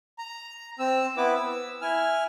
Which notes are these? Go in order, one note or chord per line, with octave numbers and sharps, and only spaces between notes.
A#5
C4 E6
B3 E4 B4 D6
E6
E4 G#5 F6